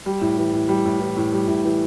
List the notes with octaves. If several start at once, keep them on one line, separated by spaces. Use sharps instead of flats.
G3
A2
E3
A2
G3
A2
E3
A2
G3
A2
E3